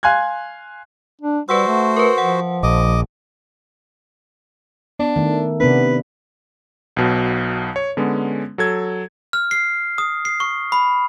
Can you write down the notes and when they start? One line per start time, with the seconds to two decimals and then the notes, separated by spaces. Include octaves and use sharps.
0.03 F5 G#5 C6 F#6 G#6
1.21 D4
1.49 G3 F#4 B4 C5 F#5 E6
1.67 A3
1.96 A#4 B4
2.18 F3 F#5
2.63 A#1 D#5 D6
4.99 B3 D4
5.16 D#3 A3
5.60 C3 B3 D4 B4
6.97 B1 B2 F#3
7.76 C#5
7.97 D3 G#3 B3 C#4
8.58 F#3 A4 G#6
9.33 F6
9.51 C7
9.98 D#6
10.25 C7
10.40 C#6
10.72 B5